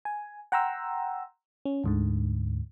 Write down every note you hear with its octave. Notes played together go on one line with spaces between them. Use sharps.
G#5
F#5 G5 A#5 C6 E6
C#4
D2 G#2 D3